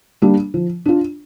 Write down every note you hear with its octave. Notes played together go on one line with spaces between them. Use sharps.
G3 A#3 D4
F3
D4 F4